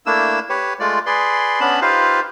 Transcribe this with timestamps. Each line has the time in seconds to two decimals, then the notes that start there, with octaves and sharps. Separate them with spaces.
0.06 A3 A#3 D4 E4 E6
0.49 G4 B4 C#5
0.80 G#3 A3 F4 D5
1.06 G#4 B4 D5 C6
1.60 B3 C#4 D4 A5 B5
1.82 D#4 F4 G4 B4 C5 F5